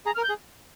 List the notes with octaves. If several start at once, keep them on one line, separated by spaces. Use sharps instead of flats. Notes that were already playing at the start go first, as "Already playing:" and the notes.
G#4 A#5
F6
A#4
G6
G#4